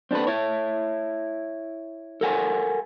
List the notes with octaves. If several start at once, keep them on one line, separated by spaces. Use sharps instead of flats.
C4 D4 G#4 A4 B4
E4 C#5
A4 A#4 F5 F#5 G#5